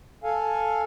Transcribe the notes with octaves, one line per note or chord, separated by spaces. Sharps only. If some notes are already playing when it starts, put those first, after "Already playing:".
A4 F5 G#5